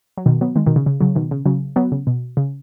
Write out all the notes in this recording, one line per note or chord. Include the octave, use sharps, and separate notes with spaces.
F#3
B2 D#3
F#3 B3
D#3 G#3
B2 D#3
C#3
C#3
C#3 F#3
B2 D#3
C#3
C#3 F#3
F#3 B3
C#3
B2
C#3